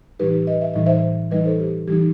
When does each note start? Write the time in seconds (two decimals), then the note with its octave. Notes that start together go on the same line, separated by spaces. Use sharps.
0.19 A2 E3 G3 D#4 G4 B4
0.33 G4
0.47 B4 D#5
0.61 E5
0.74 A2 E3 G3 D#4 D#5
0.86 C5 E5
1.31 E3 G3 D#4 B4 D#5
1.45 A4 C5
1.60 G4
1.88 E3 G3 D#4 G4